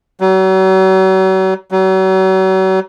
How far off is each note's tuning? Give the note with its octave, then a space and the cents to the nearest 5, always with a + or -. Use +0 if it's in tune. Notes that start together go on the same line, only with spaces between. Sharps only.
F#3 +40
F#3 +40